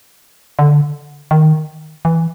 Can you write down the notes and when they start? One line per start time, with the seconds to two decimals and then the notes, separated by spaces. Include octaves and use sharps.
0.59 D3
1.31 D#3
2.05 E3